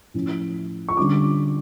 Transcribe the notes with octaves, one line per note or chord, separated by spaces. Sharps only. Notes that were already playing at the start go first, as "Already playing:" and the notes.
A2 F3 C#4
C#6
D3 G3 C#4 F4 D6